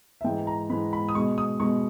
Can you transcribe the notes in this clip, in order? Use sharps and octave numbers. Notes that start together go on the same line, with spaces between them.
E5
G#2 E3 G#3 G5
A#5
G#2 E3 G#3 B5
B5
D#6
B2 G#3 C#6
D#6
B2 G#3 C#6